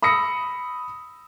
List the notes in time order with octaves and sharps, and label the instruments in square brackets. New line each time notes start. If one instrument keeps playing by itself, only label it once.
[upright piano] B5 D#6 E6 A#6 C#7